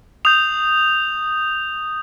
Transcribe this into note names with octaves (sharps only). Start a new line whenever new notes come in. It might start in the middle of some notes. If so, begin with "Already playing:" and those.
D#6 G6 F7